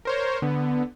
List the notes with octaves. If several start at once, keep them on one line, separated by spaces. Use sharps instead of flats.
A#4 C5 C#5
D3 B3